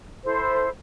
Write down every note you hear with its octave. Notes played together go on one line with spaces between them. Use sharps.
E4 A4 C5